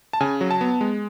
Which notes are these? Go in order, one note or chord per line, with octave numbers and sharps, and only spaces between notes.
A5
C#3 G#5
F#3
A5
B3
G#3